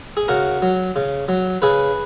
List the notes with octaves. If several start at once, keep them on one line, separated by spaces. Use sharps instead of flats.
G#4
C#3 F#4 A#4
F#3
C#3
F#3
C#3 G#4 B4